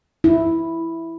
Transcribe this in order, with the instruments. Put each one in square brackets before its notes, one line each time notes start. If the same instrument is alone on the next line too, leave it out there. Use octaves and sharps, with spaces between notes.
[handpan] E4